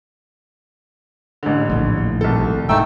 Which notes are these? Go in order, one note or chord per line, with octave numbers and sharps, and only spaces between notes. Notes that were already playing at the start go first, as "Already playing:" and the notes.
A1 D3
A#1 D#2 A2
C2 A4
G#1 G#2 A3 D#4 G5 E6